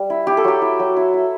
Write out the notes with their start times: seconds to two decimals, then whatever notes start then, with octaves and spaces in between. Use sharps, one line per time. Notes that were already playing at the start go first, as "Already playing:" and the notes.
Already playing: G3
0.10 E4
0.27 E4 G4
0.37 A4
0.44 F#3 G4
0.62 E4
0.79 F#3
0.97 E4
1.14 E4